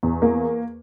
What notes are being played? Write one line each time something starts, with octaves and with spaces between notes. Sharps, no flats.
E2
A#3